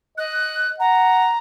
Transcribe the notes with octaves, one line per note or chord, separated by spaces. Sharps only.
D#5 F#6
F#5 A#5